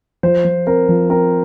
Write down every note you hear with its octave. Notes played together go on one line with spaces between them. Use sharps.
F3 C5
F3
C4 A#4
F3
C4 A#4